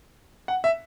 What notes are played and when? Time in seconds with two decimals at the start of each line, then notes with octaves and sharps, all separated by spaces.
0.48 F#5
0.64 E5